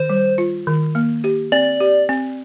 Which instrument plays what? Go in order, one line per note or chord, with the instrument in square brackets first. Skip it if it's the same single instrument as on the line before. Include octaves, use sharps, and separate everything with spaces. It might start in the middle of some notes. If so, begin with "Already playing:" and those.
Already playing: [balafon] D#3 [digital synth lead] C5
[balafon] G3
F4
D#3
A#3
G4
[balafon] C4 [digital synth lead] D5
[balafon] G4
C4